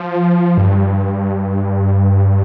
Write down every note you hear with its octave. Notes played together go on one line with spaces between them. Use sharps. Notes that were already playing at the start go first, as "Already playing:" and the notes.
Already playing: F3
G2